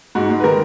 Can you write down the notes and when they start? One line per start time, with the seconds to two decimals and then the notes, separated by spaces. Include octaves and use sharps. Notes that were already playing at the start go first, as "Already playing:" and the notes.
0.15 G#2 F#4
0.29 G#3
0.40 B4
0.44 D#3 A#4